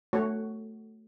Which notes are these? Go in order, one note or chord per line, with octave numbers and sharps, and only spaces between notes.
A3 F#4 C#5